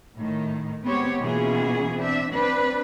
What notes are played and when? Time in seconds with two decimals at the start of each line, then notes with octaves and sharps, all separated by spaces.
0.17 A2 D#3
0.83 G#3 B3 C4 G4 C#5
1.21 B2 E3 A#3 C#4 F4 G#4
1.97 C4 D4 E5
2.31 C4 D4 B4